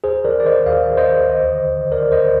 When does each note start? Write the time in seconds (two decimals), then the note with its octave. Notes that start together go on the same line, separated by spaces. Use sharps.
0.04 D#2 G#4 C5
0.24 D#3 A#4 D5
0.40 D5
0.45 D#3 C5 D#5
0.66 D#2 D5 F5
0.88 D#2
0.97 C5 D#5
1.08 D#3
1.29 D2 C5 D#5
1.49 D3
1.71 D3
1.92 D2 A#4 D5
2.12 D2 C5 D#5